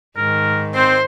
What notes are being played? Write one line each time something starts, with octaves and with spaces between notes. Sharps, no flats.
G#2 D#3 A#4
C4 C5